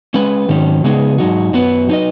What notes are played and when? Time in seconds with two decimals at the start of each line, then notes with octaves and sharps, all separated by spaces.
0.14 G#3 C#4 B4
0.48 G#2 D#3 F#3 C#4
0.84 C#3 G#3 B3 D#4 G#4
1.18 G#2 F#3 D#4 F#4
1.53 F#2 F#3 B3 F#4 B4
1.89 F#3 D#4 B4 D#5